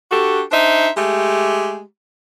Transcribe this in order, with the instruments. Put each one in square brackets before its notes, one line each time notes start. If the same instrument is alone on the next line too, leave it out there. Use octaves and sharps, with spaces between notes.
[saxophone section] D4 F#4 G4 A4
D4 D#4 C5 E5
G#3 A3 G4